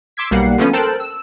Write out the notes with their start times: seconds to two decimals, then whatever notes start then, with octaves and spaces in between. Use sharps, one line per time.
0.17 C6 D6 E6 G#6 B6
0.31 B1 G3 A#3 F#5 C7
0.58 D3 F3 A3 B3 C#4 D#7
0.73 A4 A#4 C5 G5 A5 F#6
1.00 E6